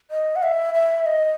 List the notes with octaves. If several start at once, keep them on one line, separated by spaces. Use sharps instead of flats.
D#5
F#5
E5
E5
D#5